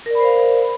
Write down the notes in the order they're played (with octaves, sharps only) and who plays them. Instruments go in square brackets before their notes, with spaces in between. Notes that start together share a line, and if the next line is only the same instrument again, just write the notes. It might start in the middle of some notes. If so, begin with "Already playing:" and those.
[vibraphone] A#4
D5
B5
C5
F5